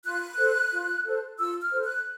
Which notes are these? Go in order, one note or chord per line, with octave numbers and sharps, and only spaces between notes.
F4 F#6
A4 C5
F4
A4 C5
F4 E6
F6
A4 C5
F#6